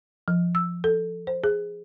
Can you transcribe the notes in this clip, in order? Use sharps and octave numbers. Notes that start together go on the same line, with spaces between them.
F3
E6
A4
C5
G#4